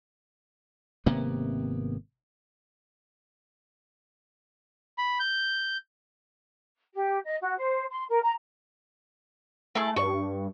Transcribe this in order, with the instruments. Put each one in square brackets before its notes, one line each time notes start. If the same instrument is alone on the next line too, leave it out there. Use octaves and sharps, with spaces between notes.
[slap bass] G#1 C3 A#3 B3
[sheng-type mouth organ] B5
G6
[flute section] G4
D#5
F#4
C5
C6
A#4
A#5
[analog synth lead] A3 [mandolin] E4 G#4 A5
[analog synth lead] G2 [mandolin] C#6